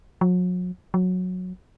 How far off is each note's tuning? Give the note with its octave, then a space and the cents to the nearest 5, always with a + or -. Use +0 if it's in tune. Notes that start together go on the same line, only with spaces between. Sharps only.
F#3 -40
F#3 -15